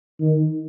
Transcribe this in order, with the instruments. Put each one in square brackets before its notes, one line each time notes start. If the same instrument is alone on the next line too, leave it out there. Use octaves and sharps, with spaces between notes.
[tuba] D#3